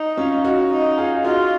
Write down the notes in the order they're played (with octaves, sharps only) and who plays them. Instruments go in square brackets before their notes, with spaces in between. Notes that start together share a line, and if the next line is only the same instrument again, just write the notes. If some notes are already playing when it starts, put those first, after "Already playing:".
Already playing: [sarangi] D#4
[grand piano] C#4 F4
D#4 F#4
[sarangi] D#4
[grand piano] F4 G#4
[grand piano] D#4 F#4 [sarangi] F4